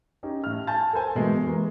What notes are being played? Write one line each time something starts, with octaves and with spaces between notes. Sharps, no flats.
C#4 D#4 G4
A2 F6
G#5 A5 G6 A6
A4 A#4 C5 G#5
B2 E3 F#3 G#3 A3
E3 G#3 A#4